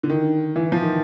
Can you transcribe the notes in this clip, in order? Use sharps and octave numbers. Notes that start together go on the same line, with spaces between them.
D3
D#3
E3
F3
D#3